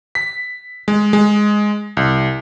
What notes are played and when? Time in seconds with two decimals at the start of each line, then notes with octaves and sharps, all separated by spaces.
0.15 B6
0.88 G#3
1.13 G#3
1.97 C2